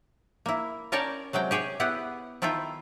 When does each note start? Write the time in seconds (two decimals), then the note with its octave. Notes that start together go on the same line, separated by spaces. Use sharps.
0.46 A#3 E4
0.92 C#4 A#4 C#5 D5 G5 A5
1.33 C3 F#3 G#3 G5
1.51 G4 G#4 C#5 G5
1.80 B3 E4 G4 F#5
2.42 D#3 E4 F4 A4 G5